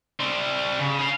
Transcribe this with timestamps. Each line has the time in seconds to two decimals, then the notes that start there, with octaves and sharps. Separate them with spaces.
0.20 G3 C4
0.79 C#3
0.99 G#4 F5